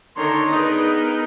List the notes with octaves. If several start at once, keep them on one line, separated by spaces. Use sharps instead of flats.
D3 D#3 D4 C#5 A#5 C6
B3 D#4 G#4 A#4 B4